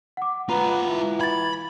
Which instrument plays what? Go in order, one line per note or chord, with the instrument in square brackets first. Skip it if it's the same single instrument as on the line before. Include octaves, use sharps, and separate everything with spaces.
[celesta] F#5 D6
[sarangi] B3 [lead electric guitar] F4 B4 [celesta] A#5
[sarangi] E3
[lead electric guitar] B5 [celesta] G#6 A6